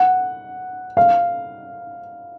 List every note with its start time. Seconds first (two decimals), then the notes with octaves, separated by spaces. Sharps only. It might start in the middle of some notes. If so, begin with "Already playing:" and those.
Already playing: F#5
0.97 F5